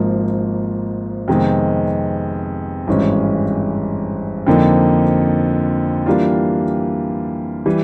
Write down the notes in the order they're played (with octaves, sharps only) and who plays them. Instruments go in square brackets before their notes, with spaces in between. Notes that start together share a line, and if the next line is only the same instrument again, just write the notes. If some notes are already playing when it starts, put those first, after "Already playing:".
Already playing: [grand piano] G#1 G#2 F3 A#3
F2 C3 D#3 G#3 B3
G#1 G2 E3 G#3 C#4
F2 D3 F3 A#3 D#4
E3 G3 A#3 D4 F4
E3 G3